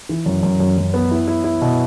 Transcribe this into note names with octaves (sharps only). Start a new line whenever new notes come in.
E3
F#2
F#2
F#2
F#2
B3
E4
E4
E4
B2